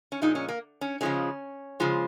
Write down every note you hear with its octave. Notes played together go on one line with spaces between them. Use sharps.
C#4
A#2 F3 G#3 D#4
C#4
A#3
C#4
C#3 F3 G#3 C#4
C#3 F3 G#3